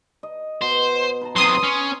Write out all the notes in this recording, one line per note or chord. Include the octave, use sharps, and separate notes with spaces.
D#5
B2 C5
B4 A5 A#5
C3 F#3 C6 D#6
C#4